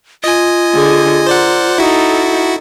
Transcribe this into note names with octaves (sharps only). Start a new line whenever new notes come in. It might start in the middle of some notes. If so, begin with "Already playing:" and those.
F4 D#5 G#5
D3 G#4
A#4 C5 D5 F#5
D#4 E4 F#4 A4